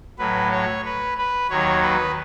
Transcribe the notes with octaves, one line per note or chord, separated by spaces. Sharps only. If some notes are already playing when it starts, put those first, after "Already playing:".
A2 F#3 B4
C#5
B4
B4
D#2 D#3 F#3 C#5
B4